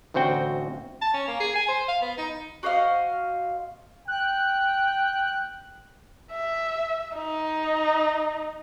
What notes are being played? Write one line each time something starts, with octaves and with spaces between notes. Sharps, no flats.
A1 D2 C4 F#4 G5
A5
C#4
A#3
G#4
G#5
C5
F5
B3
D#4
F#4 C5 D#5 F5
G5 F#6
E5
D#4